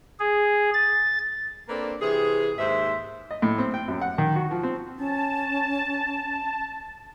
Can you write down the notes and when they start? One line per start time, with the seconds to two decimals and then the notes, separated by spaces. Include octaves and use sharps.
0.20 G#4
0.74 A6
1.69 A#3 C4 D4 A4 B4
2.01 C3 E3 G#4
2.58 D#2 G#2 C5 E5
3.31 D#5
3.42 A2
3.58 C4
3.74 G5
3.88 F#2
4.01 F#5
4.18 D#3
4.36 F#4
4.51 F3
4.63 C4
4.98 C#4 A5